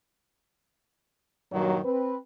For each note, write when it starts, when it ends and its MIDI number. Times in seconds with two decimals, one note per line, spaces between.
1.52 1.79 43
1.52 1.79 46
1.52 1.79 51
1.52 1.79 54
1.85 2.17 60
1.85 2.17 71